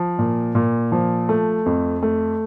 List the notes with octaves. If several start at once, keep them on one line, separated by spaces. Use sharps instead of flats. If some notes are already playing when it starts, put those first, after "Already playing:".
Already playing: F3
A#2
A#2
F3
A3
F2
A3